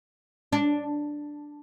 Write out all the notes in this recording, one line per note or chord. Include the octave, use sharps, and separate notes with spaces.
D4